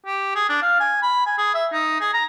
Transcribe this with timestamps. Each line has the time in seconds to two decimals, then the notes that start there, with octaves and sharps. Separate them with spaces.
0.06 G4
0.35 G#4
0.49 D4
0.62 F5
0.80 G#5
1.03 B5
1.26 G#5
1.38 G#4
1.54 E5
1.73 D#4
2.00 G#4
2.14 A#5